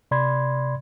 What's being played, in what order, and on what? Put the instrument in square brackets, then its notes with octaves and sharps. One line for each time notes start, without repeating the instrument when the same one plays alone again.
[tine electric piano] C3 D5 B5 C6 G#6